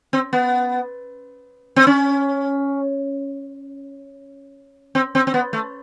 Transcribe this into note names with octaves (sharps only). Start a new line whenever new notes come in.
C4
B3
C4
C#4
C4
C4
C4
B3
A3